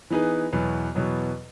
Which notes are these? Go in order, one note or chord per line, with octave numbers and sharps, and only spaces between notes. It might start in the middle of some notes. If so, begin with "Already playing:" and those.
E3 B3 D#4 G#4 B4
E2 B2 F#3 B3
E2 B2 F#3 B3